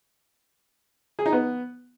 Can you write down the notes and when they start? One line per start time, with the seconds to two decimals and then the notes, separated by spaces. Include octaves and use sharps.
1.19 G#4
1.26 D#4
1.33 B3